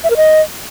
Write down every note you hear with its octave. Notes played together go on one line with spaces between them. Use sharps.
E5
A#4
D#5